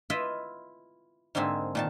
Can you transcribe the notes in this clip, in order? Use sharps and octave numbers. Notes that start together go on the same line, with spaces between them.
E4 F4 B4 D#5 E5
G#2 D3 A#3 C4 G#4 E5
A#2 D#3 A5